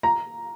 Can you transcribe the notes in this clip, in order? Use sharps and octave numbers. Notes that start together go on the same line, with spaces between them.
A#5